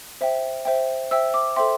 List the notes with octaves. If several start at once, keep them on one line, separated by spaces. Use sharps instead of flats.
C5 E5 G5
C5 E5 G5
C5 E5 G5 E6
D6
A4 C5 E5 G5 C6